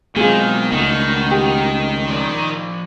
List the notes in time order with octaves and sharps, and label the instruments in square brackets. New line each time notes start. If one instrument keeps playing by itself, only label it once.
[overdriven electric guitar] B2 F#3 [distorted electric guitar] D#3 [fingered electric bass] G#3 B3 C4 [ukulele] F4 G#4
[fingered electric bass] C#2 A3 [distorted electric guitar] D#3 [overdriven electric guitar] D#4 F#4
[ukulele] G4
[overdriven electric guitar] F3 D5